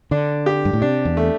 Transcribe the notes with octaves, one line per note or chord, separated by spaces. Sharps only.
D3 D4
G4
G2
A2
C3 D4
E2
A3